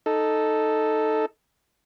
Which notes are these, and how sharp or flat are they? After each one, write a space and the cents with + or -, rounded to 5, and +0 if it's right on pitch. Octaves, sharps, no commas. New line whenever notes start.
D#4 -5 A4 +0